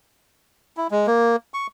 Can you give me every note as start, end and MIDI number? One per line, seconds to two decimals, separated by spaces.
0.77 0.87 64
0.91 1.07 56
1.07 1.36 58
1.54 1.67 85